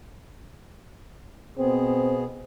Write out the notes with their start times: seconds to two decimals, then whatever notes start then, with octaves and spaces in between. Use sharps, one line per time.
1.57 B2 B3 C4 G#4